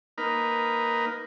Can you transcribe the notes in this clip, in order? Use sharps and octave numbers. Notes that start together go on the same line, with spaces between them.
A#3 D#4 A#4 B4